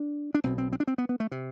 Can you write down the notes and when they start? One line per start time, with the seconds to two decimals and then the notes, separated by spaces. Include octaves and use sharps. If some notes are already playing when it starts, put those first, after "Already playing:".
Already playing: D4
0.34 D4
0.44 B1 B2 C4
0.58 C4
0.73 C4
0.80 D4
0.87 C4
0.98 B3
1.09 B3
1.20 A3
1.32 C3